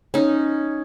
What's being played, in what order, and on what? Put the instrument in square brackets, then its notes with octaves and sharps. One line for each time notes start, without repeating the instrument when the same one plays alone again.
[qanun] C#4 D#4